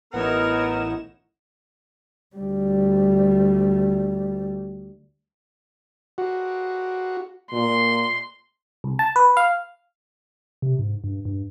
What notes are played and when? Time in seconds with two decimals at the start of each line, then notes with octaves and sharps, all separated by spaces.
0.13 A1 B3 D#4 E4 A#4 C#5 F#5 E7
2.36 D2 G3
6.18 F#4
7.52 A#2 C6
8.84 C2
8.99 A5
9.16 B4
9.37 F5
10.62 C3
10.79 G#2
11.04 G2
11.25 G2